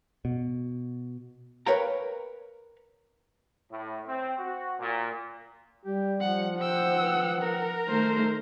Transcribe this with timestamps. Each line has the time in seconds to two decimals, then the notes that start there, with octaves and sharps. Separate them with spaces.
0.25 B2
1.66 A#4 B4 C#5 F5 G5 A#5
3.70 A2
4.06 C4
4.39 F#4
4.79 A#2
5.85 G3 G4
6.20 F3 F#5
6.59 C5 F#5 G5 E6
7.01 B4
7.40 A#4
7.89 D#3 A3 C5